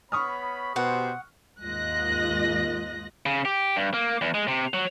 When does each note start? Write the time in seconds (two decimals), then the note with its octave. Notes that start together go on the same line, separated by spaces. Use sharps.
0.12 B3 C#5 B5 C#6 D#6 F6
0.76 B2 G4 C5 F#5
1.60 D#2 G#2 F4 D#5 F#6 A#6
3.26 C#3
3.45 G4
3.76 G2
3.94 A#3
4.21 E2
4.34 G#3
4.48 C3
4.74 F#3